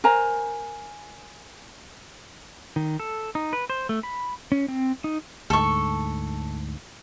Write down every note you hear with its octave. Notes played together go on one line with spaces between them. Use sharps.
A#4 C5 G#5 A#5
D#3
A4
D#4
B4
C5
A3
B5
C#4
C4
D#4
D2 G#2 A4 C#6